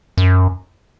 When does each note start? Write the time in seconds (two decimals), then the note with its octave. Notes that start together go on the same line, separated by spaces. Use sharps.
0.17 F#2